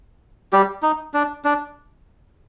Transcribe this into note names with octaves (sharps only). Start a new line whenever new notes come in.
G3 G4
D#4
D4
D4